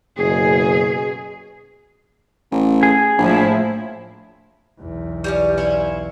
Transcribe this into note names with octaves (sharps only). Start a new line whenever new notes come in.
F#1 B2 G#4
A1
G#4
A#1 A2 F3 E4
B1 E2
G3 A#3 C#4
C#4 E4 F4